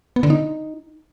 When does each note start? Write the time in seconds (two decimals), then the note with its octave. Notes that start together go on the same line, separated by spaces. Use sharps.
0.16 B3
0.23 D3
0.30 D#4